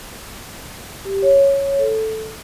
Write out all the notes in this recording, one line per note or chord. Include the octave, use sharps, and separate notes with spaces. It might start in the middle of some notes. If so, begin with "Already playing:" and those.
G4
C#5
A4